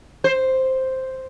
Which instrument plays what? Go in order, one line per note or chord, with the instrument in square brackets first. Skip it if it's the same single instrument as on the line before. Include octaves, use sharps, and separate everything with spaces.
[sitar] C5